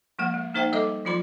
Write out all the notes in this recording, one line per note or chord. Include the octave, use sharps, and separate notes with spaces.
F3 G#3 A#3 F#5
G#3
A#3 D#4 C5 E5 G5
G3 A4 D#5 E5 D6
F3 F#3 F4 B5 C6